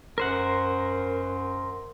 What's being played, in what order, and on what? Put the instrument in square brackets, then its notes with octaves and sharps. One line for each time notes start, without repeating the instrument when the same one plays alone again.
[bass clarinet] F#2 [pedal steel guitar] A#4 C5 F#5